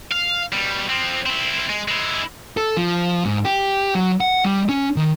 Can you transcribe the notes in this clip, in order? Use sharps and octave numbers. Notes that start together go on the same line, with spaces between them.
F5
B2 G3
F3 C4
C4 E4
G#3
G#3 E4
A4
F3
G#2
G4
F#3
F#5
G3
C#4
D#3